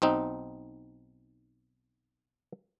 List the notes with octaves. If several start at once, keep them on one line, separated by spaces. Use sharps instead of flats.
B1 C4 D#4